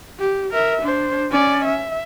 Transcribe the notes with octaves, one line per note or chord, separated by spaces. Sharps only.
G4
A#4 E5
D4 C5
C#4 D5
E5